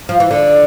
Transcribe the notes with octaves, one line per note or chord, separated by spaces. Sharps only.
F3
E3
D3 D5